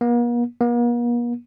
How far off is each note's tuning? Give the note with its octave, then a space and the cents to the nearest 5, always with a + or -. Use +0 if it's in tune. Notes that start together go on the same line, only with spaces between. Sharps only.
A#3 +45
A#3 +45